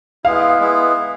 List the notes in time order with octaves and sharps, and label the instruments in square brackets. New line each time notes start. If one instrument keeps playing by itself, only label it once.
[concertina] G#3 B3 E4 [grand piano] F5
[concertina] G#3 B3 E4